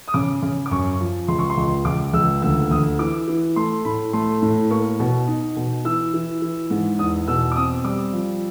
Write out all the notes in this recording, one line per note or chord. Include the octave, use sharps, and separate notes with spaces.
D#6
C#3 D6
C#3
D6
F#2 C#6
F3
C#2 C6
C#6
C6
C#2
C#2 D6
C#2 E6
D2 E6
D2 D#6
E3 D6
E3
A3 C6
A2 B5
A3 C6
A2
A#3 C#6
B2
D#4
B2
E3 E6
E3
E3
G#2
E2 D#6
B2 E6
D6
C4 D#6
G3 D6
F3